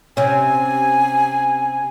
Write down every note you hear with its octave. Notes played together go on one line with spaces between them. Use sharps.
C3 C#4 G#5